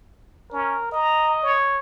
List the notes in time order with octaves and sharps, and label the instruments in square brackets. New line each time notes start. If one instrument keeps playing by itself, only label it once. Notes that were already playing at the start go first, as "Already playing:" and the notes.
[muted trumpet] C#4 [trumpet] A#4
[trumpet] D#5 [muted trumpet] A#5
[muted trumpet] C#5